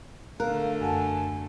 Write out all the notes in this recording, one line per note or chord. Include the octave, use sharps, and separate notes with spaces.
D3 A3 A#4 F5 F#6
F#2 F#5 G#5 A5